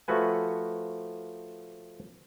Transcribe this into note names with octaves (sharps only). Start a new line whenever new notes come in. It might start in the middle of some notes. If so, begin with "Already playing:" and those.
F3 A3 F#4 B4 G#5